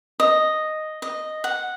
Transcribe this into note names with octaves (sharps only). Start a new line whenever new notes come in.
D#5
D#5
F#5